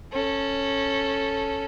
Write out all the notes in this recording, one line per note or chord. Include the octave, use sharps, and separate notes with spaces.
C#4 A4